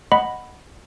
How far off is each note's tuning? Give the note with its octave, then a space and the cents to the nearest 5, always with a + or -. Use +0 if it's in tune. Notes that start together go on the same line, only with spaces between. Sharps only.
D#5 +0 F#5 +0 B5 +0